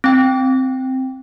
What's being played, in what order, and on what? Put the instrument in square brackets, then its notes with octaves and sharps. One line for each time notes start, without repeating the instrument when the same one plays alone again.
[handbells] C4 G5